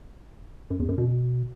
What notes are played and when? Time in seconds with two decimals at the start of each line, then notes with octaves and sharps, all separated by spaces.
0.70 F#2
0.80 E2
0.89 F#2
0.98 B2